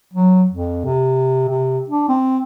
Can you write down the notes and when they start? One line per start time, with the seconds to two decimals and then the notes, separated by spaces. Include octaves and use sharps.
0.14 F#3
0.51 F2
0.85 C3
1.49 C3
1.90 D4
2.09 C4